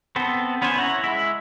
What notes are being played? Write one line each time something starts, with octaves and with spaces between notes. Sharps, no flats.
B3 C4 A4
B3 C#4 B4 C5 G#5
E4 C#5 F#5 A5 A#5
G#3 E4 E5